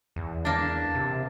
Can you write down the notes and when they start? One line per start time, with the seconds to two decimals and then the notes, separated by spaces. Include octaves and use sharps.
0.16 E2
0.45 A#3 D4 A5
0.95 C3